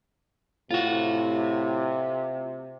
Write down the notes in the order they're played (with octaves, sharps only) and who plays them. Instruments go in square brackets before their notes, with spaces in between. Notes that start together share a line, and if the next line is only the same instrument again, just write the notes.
[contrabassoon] A2 [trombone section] C3 [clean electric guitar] F4 F#4